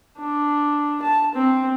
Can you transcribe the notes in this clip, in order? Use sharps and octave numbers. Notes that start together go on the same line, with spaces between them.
D4
A5
C4